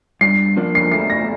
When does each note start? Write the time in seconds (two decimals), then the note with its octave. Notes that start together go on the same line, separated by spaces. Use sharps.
0.21 G2 C7
0.57 F3 A#3 D4
0.75 C7
0.92 A3 C7
1.10 A#6